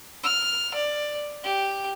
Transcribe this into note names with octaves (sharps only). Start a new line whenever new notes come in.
F6
D5
G4